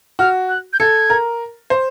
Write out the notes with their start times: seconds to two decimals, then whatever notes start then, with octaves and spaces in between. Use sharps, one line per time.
0.19 F#4 F6
0.49 F#6
0.73 G6
0.80 A4 G#6
1.10 A#4
1.70 C5